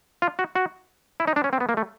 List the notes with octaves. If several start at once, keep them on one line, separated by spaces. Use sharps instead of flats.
F4
F#4
F#4
E4
D#4
D4
C#4
C4
B3
A#3
A3